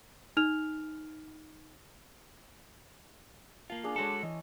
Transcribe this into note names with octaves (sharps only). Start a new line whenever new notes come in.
D#4 F6 F7
A#3 F4 A5
D4 G#4 A5
G#3 F#4 A4 C#5 A5 C6
E3 D#5